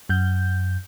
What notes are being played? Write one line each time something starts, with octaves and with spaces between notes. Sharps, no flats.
F#2 G6